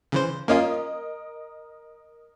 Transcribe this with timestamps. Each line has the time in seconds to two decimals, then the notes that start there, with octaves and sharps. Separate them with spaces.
0.12 C#3 E3 C5
0.48 A#3 C#4 F4 A#4 D#5